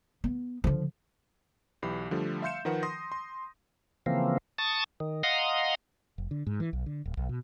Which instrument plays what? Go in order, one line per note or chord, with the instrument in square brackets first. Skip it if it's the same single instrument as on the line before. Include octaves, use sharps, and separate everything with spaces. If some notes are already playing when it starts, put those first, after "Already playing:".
[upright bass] B3
D3 F3
[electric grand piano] B1 E3 G4 B5 C7
D3 F3 G3 A3
E5 F5 C6 G6 C#7 E7
D#3 F3 A#4 B4 F#5
C6 D#6 A#6
C6
[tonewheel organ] C#3 E3 F3 A#3 C4
A5 C#6 D#6 A6
D#3
D#5 F5 F#5 A#5 C6 D#6
[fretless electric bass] F1
D3
G#2
E3
B1
D3
D1
B1
B2